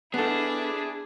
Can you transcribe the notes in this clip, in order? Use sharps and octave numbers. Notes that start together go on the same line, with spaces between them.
B3 D4 E4 G#4 A4